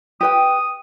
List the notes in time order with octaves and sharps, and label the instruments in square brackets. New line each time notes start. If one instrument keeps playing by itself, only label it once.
[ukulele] G4 B4 G5 [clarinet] D#6